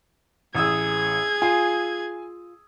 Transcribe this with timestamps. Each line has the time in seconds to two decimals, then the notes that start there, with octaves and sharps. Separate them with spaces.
0.55 A1 G#4 D#6 E6 G#6
1.42 F4 G#5